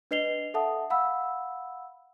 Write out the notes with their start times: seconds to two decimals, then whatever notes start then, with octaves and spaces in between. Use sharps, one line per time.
0.11 D4 B4 D#5 C7 F7 G7
0.54 A4 E5 F#5 A5 D#6
0.90 F5 F#5 B5 E6